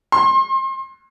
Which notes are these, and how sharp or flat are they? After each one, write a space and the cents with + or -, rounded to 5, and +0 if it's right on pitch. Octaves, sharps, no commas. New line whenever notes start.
C6 +30